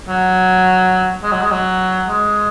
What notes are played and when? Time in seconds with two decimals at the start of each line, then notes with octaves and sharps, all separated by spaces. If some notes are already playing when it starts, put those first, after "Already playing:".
0.09 F#3
1.23 G#3
1.32 F#3
1.42 G#3
1.51 F#3
2.08 G#3